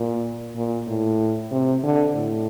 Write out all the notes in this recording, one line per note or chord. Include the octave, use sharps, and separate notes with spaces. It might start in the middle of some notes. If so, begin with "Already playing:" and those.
Already playing: A#2
A#2
A2
C3
D3
A2